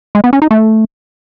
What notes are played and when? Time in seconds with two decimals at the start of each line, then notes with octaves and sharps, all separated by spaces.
0.15 G#3
0.24 B3
0.33 C#4
0.42 D#4
0.51 A3